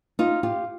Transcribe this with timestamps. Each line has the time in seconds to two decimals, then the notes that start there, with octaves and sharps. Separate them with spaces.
0.19 D#4 F4
0.43 F4 G4